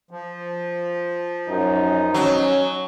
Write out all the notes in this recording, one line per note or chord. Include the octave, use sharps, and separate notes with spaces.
F3
F#2 D#4
F#3 C#4